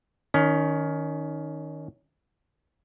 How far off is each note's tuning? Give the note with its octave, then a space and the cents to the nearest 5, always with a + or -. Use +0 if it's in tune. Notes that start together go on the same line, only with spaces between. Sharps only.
D#3 +0 C#4 +20